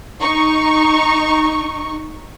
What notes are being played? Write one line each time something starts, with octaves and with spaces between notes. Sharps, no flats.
D#4 C#6